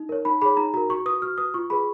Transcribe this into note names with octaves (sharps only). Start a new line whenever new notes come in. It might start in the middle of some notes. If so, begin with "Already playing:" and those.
Already playing: D#4
A#4 C#5
D#4 B5
G#4 C#5 B5
D#4 A#5
F#4 A#4 A#5
F#4 C#6
B4 D#6
F#4 F6
B4 D#6
F4 C#6
G#4 B4 B5